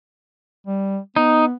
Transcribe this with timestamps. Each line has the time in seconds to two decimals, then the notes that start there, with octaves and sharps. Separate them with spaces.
0.67 G3
1.16 B3 D#4